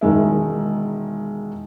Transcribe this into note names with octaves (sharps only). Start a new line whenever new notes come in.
E1 D#3 G#3 E5